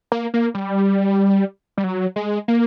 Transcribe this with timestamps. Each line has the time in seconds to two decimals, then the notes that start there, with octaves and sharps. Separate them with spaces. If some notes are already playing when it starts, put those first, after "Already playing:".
0.12 A#3
0.34 A#3
0.54 G3
1.77 G3
1.84 F#3
2.16 G#3
2.48 A#3